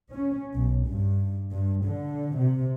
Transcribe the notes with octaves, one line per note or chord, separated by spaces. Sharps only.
C#4
B1
G2
G2
D3
C3